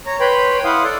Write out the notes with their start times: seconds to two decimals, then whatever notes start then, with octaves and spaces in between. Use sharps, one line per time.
0.06 C#5 A#5
0.20 B4 C#5 G5 B5 C6
0.65 E4 F5 F#5 C6 D#6
0.84 A4 D5